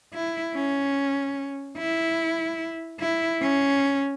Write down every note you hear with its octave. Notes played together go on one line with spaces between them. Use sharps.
E4
C#4
E4
E4
C#4